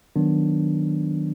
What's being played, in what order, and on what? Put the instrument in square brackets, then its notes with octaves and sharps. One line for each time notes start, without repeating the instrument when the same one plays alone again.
[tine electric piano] D#3 F#3 B3 D4